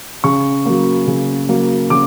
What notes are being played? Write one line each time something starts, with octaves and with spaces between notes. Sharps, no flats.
C#3 C#6
F#3 A#3
C#3
F#3 A#3
C#3 D6